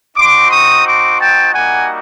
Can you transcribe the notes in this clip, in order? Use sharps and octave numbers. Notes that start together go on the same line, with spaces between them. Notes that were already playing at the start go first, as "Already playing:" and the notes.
C4 D#4 F#4 C6 D6
C#6 D#6
C6 D6
G5 A5
G3 A#3 D#4 F#4 F#5 G#5